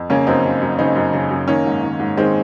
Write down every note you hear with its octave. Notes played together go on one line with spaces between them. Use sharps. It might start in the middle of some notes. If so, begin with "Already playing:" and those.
Already playing: F2
C#3 A#3 C#4
F#2 C4 D#4
C#3
F#2
C#3 C4 D#4
F#2
C#3
F#2
D#3 A#3 C#4
G#2
D#3
G#2
D#3 G#3 C4